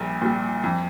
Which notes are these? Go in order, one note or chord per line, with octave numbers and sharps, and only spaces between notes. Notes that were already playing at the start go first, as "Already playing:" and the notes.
Already playing: A#1 A#2 G3
A#2 G3
F2